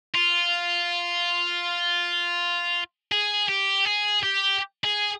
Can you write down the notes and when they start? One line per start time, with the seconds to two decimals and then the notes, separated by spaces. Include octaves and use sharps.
0.15 F4
3.12 G#4
3.49 G4
3.85 G#4
4.23 G4
4.84 G#4